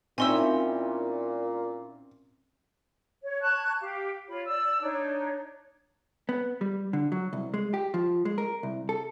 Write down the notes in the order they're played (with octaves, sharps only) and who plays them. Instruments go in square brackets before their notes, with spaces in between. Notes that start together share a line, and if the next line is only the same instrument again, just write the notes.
[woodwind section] A#2 [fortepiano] C4 [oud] C#4 D#4 E4 [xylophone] G#5 C6 E6
[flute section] C#5
A5 C#6 F#6 G#6
G4 F5
F4 C#5 B5
D5 E6
D4 D#4 C#5
[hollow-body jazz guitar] B3
G3
D3
F#3
C2
G#3
G4
F3
G#3
A#4
C2
A4